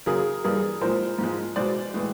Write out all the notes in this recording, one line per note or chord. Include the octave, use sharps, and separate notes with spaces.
F#2 C#3 F#3 G#4 A#4
G2 E3 G3 G#4 A#4
A#2 F3 G#3 A#4 C5
G#2 F3 G#3
B2 G#3 C5 D5
A2 E3 G#3